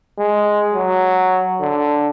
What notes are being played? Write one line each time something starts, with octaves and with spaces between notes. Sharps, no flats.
G#3
F#3
D3